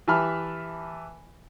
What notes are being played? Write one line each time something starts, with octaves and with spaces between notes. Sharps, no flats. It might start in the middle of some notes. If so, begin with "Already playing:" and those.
E3 G4 E5 A5 B5 F6